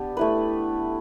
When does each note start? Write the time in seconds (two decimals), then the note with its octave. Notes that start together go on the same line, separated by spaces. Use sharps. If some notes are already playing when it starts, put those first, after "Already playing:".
Already playing: B3 D4 G4
0.17 A3 E4 B4